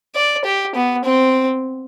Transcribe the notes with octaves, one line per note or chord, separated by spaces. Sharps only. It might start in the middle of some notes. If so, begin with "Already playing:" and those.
D5
G4
B3
C4